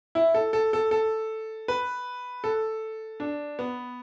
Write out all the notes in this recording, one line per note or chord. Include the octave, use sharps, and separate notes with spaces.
E4
A4
A4
A4
A4
B4
A4
D4
B3